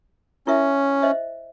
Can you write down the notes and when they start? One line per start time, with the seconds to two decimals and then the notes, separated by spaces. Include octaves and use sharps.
0.47 C#4 E4 A#4 E5
1.02 C5 D#5 E5